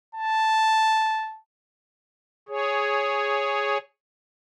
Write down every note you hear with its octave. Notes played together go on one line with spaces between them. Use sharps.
A5
G#4 C#5